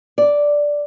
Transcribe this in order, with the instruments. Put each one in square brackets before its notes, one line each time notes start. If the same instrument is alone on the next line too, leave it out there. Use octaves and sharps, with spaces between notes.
[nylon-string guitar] D5